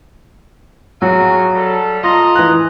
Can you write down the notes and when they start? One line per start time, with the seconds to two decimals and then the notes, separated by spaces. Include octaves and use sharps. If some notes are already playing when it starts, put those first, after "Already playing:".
1.02 F#3 F4 F#4 G#4
1.55 G3 A4
2.04 F4 D#5 A#5
2.35 E3 F#6